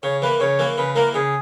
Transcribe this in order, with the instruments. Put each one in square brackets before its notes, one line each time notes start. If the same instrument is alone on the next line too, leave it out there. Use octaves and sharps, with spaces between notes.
[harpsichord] C#3 [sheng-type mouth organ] C#5
[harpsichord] E3 A#3 [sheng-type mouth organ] B4
[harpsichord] C#3 [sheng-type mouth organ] C#5
[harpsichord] E3 A#3
[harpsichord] C#3 [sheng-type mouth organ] B4
[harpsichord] E3 A#3 [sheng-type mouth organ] A#4
[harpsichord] C#3 [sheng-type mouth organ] G#4